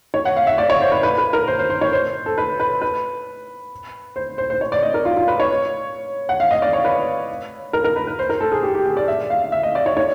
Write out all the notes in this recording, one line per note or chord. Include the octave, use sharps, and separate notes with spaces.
C#5
F#5
F5
E5
D5
C#5
C5
B4
B4
B4
A#4
C5
C5
C5
C#5
C5
A4
B4
B4
B4
C5
C5
C5
C#5
D5
D#5
A#4
F4
F4
B4
C#5
F#5
F5
D#5
D5
C#5
B4
A#4
A#4
B4
B4
C5
A#4
A4
G#4
G4
G4
G#4
D5
E5
F5
E5
D#5
D5
C#5
C#5